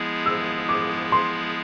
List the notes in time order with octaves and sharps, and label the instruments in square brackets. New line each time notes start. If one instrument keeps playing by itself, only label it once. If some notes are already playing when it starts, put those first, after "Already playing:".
Already playing: [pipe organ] F3 G#3 B3 E4 G#4
[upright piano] E6
D6
C6